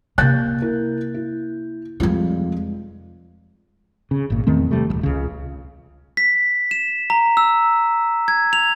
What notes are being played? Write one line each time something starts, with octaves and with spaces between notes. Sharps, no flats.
C3 A#3 F#6 G6 A6
E4 A#4
E4
F1 G3 G#3 F4
C#3
G#1 A#2
E2 D#3 A3 C4
C3 E3 G3 A3
D#1 A#1
C#2 C#3
B6
E7
A#5
E6
G#6
F7